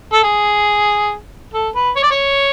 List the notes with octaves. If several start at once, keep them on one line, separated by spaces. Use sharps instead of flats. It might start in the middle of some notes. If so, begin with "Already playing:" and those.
A4
G#4
A4
B4
C#5
D5
C#5